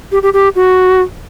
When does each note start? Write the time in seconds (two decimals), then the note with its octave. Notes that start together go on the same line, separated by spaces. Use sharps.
0.12 G4
0.23 G4
0.33 G4
0.55 F#4